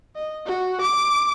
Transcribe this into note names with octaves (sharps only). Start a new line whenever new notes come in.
D#5
F#4
D6